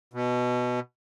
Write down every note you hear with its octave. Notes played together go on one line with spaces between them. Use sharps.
B2